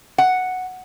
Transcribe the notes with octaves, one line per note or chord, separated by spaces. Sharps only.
F#5